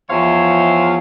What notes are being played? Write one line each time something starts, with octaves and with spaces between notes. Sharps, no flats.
E2 F3 C5 C#5 E5 F5